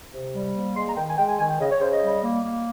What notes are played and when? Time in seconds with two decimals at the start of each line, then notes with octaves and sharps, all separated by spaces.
0.13 C3
0.34 G3
0.55 A#3
0.76 G#3 C6
0.87 A#5
0.97 D#3 G5
1.08 G#5
1.17 G#3 G5
1.28 G#5
1.39 D#3 G#5
1.50 G5
1.60 C#3 D#5
1.71 C#5
1.81 C#3 C5
1.92 D#5
2.02 G3
2.23 A#3
2.44 A#3